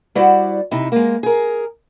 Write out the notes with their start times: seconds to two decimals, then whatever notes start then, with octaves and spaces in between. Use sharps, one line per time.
0.15 G3 E4 F#4 C5 D5 F#5
0.71 C3 D#4 E4
0.92 G#3 A#3
1.23 G#4 A#4